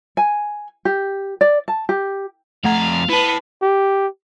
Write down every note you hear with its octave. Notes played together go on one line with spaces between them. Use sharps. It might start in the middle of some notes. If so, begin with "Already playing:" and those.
G#5
G4
D5
A5
G4
F2 A3 F5 F#5 A#5 G#6
B3 E4 B4 A5
G4